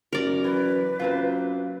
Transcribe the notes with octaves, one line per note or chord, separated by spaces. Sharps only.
F#2 A#4 D5
E3 B4
F#2 A#3 C4 F4